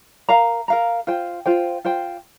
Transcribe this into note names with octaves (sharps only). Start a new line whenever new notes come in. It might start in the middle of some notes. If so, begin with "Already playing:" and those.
A#4 F5 A#5
A#4 F5 A#5
F4 C5 G5
F4 C5 G5
F4 C5 G5